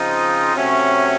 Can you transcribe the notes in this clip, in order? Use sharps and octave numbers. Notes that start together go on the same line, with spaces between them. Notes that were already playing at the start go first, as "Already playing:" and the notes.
Already playing: C#3 F3 C4 D#4 F4 D#5
C3 F#3 A3 C#4